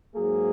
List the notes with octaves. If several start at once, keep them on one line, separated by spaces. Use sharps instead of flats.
G#2 F#3 A#3 G#4